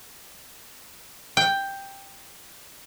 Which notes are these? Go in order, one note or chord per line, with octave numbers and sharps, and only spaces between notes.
G5